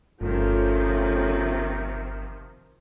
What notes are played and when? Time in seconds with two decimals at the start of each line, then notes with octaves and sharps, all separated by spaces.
0.21 G1 C3 D#3 F3 A3 C#4 F4